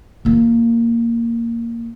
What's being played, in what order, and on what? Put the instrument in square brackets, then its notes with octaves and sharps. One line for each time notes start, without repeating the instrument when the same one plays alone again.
[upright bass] A#2 A#3